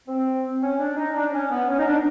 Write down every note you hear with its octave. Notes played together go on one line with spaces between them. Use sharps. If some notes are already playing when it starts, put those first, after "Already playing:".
C4
C#4
D4
D#4
D4
C#4
B3
C#4
D#4
D4